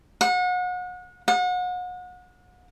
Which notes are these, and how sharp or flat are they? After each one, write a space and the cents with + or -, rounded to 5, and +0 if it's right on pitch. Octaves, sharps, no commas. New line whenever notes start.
F#5 -35
F#5 -35